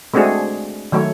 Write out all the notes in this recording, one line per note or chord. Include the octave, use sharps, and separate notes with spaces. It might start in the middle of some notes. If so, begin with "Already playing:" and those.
G#3 A3 C4 D4 F#4 G#4
D#3 F#3 A3 C#5